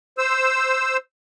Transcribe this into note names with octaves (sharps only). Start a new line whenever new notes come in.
C5 E6